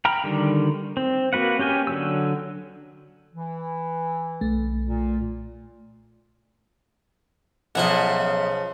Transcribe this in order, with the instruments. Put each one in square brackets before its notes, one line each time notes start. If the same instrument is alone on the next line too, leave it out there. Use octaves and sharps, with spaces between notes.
[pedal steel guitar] G5 A#5 B5 F6
D3 D#3 G3
C4
A#3 F#4 B4 F#5
C#4 G4 G5 G#5 F6
D3 F#3 E6
[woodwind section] E3
[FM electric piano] B1 A3
[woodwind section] A#2
[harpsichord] B1 E4 D#5 [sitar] C#3 F3 [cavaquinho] F#5